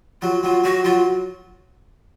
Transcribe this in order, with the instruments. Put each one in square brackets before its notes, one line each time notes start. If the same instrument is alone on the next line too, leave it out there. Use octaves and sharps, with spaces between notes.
[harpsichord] F#3 [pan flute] F4
[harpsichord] F#3 [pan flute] F4
[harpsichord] F#3 [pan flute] F#4
[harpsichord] F#3 [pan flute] F4